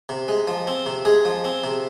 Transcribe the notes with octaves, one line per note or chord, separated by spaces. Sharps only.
C3
G#3
F3
C4
C3
G#3 G#4
F3
C4
C3